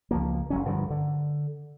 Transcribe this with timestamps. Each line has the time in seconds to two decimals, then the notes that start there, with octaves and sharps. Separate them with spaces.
0.11 C#2 F3 A#3
0.50 F#1 F#3 C#4
0.65 G2 D3 D#3 F3
0.90 D3